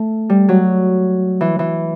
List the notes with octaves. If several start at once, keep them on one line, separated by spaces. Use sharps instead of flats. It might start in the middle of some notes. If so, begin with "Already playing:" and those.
Already playing: A3
G3
F#3
E3
E3